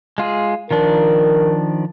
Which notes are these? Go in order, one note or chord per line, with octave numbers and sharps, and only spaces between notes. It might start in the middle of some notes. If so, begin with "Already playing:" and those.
G#3 F4 G#4
D#3 F3 D4 A#4